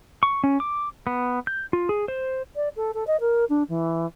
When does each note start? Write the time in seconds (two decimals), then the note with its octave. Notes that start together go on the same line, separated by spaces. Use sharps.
0.23 C#6
0.44 C#4
0.60 D6
1.07 B3
1.47 G6
1.73 F4
1.89 G#4
2.08 C5
2.56 D5
2.76 A4
2.94 A4
3.07 D#5
3.21 A#4
3.49 D4
3.69 E3